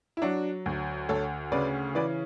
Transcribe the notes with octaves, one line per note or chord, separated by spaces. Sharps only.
E4
F#3 D4 F#4
D2
D2 A4 C#5
C#3 B4 D5
E3 B4 D5